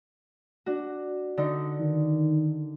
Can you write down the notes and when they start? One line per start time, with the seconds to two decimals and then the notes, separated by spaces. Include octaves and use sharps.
0.66 D4 F#4
1.37 D3 D#4
1.80 D#3